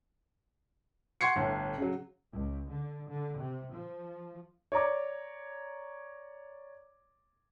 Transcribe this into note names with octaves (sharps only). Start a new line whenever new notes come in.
F#5 C6 C#6 G#6 C7 C#7
G1 A2
C#3 F#3
C#2
D3
D3
C3
F3
C#5 D5 A#5 D6